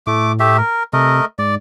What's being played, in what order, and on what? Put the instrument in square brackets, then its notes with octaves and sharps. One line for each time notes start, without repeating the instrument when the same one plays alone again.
[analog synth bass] A2 [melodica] A3 D6
[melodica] A3 G4 E5
A#4
[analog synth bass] C3 [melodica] A3 A#4 D#5
[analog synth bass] G#2 [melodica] D5